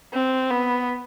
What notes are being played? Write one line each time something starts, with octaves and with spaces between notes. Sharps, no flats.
C4
B3